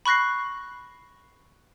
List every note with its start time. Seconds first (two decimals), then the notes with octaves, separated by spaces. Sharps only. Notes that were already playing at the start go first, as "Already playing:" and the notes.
0.06 B5 C#6 F#6 A#6 C7